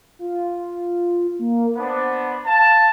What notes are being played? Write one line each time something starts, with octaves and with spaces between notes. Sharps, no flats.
F4
A#3
B3 D4 C5
F5 A5